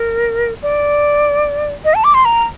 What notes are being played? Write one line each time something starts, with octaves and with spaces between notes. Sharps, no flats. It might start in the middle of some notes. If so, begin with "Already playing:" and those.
Already playing: A#4
D5
D#5
A5
D6
C6
A#5